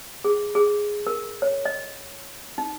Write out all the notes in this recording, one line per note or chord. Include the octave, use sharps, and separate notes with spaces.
G#4
G#4
A#4
C#5
D#5
D#4